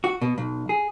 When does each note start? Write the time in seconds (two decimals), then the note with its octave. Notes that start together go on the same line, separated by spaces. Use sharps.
0.04 F#4
0.21 B2
0.38 B1
0.69 G#4